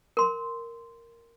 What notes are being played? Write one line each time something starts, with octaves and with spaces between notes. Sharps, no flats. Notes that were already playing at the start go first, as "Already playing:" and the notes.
A#4 C6